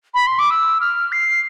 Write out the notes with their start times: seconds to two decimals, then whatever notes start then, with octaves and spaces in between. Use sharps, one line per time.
0.14 B5
0.27 C6
0.39 D6
0.50 E6
0.81 F6
1.12 C7